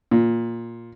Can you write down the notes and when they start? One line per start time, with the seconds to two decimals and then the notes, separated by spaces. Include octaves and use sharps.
0.11 A#2